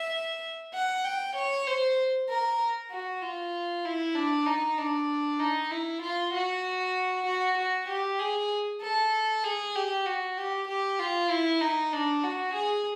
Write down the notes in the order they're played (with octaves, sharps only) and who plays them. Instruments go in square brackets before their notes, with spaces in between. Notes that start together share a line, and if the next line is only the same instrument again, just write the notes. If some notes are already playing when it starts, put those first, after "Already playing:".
Already playing: [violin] E5
F#5
G5
C#5
C5
A#4
F#4
F4
E4
D4
D#4
D4
D#4
E4
F4
F#4
F#4
F#4
G4
G#4
A4
G#4
G4
F#4
G4
G4
F4
E4
D#4
D4
F#4
G#4